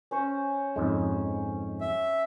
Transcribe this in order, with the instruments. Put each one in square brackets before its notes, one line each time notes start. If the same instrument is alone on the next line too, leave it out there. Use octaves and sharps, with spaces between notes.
[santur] C#4 C5 C#5
[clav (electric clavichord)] F2 G#2 G#3
[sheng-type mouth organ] E5